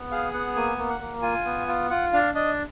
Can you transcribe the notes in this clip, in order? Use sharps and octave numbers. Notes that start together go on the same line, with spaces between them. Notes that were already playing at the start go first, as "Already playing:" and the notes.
Already playing: B3
G#4 F5
B3 F#5
A#3 G#5
A#3
F#5
A#3
F4 G#5
B3
F4
F4 F#5
D4 F5
D4 D#5